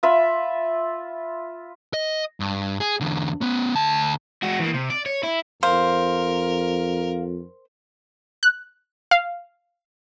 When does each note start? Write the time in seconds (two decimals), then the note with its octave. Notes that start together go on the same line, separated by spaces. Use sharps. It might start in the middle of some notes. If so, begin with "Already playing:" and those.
0.03 F4 E5 B5
1.94 D#5
2.40 G2
2.80 G#4
3.00 E2 D3
3.41 B3 C#4
3.74 D2 A5
4.43 G#3 F#4
4.60 E3 A#3
4.74 C3
4.90 D5
5.06 C#5
5.23 E4
5.63 F2 A#4 C5 F5
8.43 F#6
9.11 F5